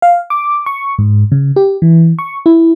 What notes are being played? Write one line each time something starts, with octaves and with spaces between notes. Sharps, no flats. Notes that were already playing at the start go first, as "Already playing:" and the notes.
F5
D6
C#6
G#2
C#3
G4
E3
C#6
E4